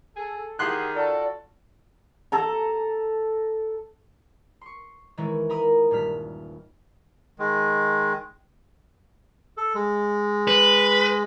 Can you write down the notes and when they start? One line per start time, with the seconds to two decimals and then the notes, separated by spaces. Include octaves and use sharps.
0.16 G#4 A4
0.59 D#3 G4 G#4 F#5 C6 F#6
0.95 F4 F#4 A4 D5
2.32 A4 A#5
4.61 C6 C#6
5.17 D#3 E3 G#3 C#4 E4
5.49 A#4 A#5 B5 D#6
5.91 D#1 G2 F6 B6
7.39 D#3 G#3
9.57 A4
9.75 G#3
10.48 B4